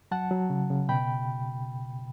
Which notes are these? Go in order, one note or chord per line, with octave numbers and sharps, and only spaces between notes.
F#3 F#5 A5
F#3
C#3
C#3
B2 G5 B5